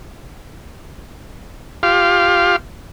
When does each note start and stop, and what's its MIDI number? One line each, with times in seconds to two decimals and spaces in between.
1.83 2.56 65
1.83 2.56 67
1.83 2.56 77